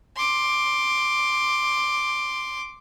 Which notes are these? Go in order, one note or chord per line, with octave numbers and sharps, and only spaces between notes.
C6 D6